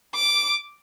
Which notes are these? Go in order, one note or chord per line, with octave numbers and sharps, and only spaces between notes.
D6